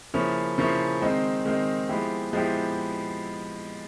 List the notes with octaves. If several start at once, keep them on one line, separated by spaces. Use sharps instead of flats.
C#3 F3 A#3 C#4 E4
C#3 F3 A#3 C#4 E4
D#3 G#3 C4 D#4
D#3 G#3 C4 D#4
F3 G#3 B3 E4 G4
F3 G#3 B3 E4 G4